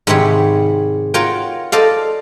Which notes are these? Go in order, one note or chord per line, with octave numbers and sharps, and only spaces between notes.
G#2 C3 D#3 C4 C#5 B5
F4 F#4 A#4 C#5 G5
A4 C5 D5 D#5 F5